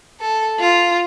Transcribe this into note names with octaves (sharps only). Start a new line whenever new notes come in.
A4
F4